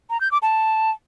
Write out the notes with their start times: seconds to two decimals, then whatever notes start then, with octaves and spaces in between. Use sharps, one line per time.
0.10 A#5
0.21 G6
0.31 D6
0.42 A5